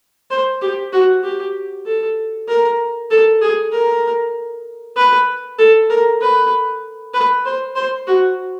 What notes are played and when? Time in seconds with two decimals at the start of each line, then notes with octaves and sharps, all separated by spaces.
0.30 C5
0.61 G4
0.93 F#4
1.24 G4
1.86 A4
2.48 A#4
3.10 A4
3.41 G#4
3.72 A#4
4.96 B4
5.58 A4
5.90 A#4
6.21 B4
7.14 B4
7.45 C5
7.76 C5
8.07 F#4